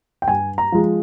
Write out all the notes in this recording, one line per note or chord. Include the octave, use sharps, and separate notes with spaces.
G5
G2 G#5
A#5
F3 G#3